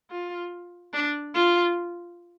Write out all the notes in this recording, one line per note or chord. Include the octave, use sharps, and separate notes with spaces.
F4
D4
F4